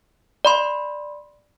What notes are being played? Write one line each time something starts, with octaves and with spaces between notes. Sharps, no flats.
D5 B5 C6